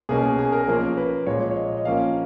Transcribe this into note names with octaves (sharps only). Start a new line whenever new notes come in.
B2 A#3 C#4 G#4
G#4
G#4
A#4
F3 A#3 C#4 A#4
B4
A#2 F3 G#3 C#5
C#5
D#5
D#5
F3 A#3 C#4 F5